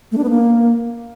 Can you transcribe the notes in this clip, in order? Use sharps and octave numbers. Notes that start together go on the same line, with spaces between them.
A3
D4
B3
A#3